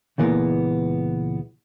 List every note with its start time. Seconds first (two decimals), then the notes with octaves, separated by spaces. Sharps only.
0.18 C#2 A#2 E3 G#3 B3